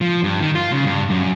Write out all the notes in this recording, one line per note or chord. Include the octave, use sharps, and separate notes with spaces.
F3
G2
D#3
F4
C#3
G2
F#2